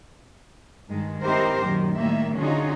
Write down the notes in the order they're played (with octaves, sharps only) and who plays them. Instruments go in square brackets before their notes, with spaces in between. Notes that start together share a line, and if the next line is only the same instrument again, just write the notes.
[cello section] G2 D#3 G#3
C4 D#4 E4 G4 A#4 C5
F#2 A#2 D#3
A2 D#3 G3 A#3 E5
D3 C#4 D#4 F4 F#4 G#4